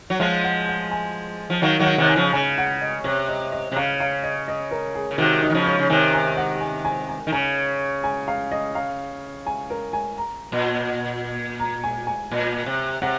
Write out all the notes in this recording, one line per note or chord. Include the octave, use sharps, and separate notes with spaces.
F#3
F3 G#3 F5
F#5
F#5
G#5
F3
D#3 F#3 F5
D#3 F#3
F#5
C3 D#3
G#5
C#3 F3
C#3 G#5
F#5
D#5
C3 C#5
D#5
D#5
C3
C#3 F5
F5
D#5
D#5
A#4
G#4
C#3
C3 D#3 F#4
D#4
D#3
C#3 F3
C#5
C#3
C3 D#3 G#5
G#5
F#5
G#5
G#5
G#5
D#3
C#3 G#5
G#5
F5
D#5
F5
G#5
A#4
G#5
A#5
A#2
A#5
G#5
G#5
A#2
C3
C3 F#5